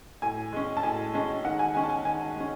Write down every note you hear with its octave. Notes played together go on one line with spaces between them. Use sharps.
A2 G#5
G#3 C#4
A5
A2 G#5
G#3 C#4
D#3 F#5
G#5
G#3 C#4 G#5
A5
G#5
D#3 G#5
G#3 C#4